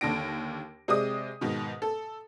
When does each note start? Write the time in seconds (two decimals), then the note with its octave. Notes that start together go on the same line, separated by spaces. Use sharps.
0.01 D#2 D3 D4 A#6 D7
0.88 C3 G#3 D5 D#6
1.41 G#2 B2 D#3
1.82 A4